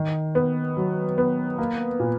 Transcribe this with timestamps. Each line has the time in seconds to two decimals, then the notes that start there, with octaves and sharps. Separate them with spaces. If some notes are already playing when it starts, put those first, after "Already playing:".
Already playing: D#3
0.35 B3
0.77 F#3
1.18 B3
1.58 A#3
2.00 A#2